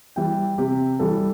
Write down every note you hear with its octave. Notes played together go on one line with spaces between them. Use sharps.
E3 G3 G5
C3 G4
E3 G3 A4